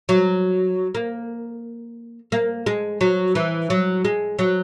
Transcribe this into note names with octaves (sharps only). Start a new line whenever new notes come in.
F#3
A#3
A#3
G#3
F#3
E3
F#3
G#3
F#3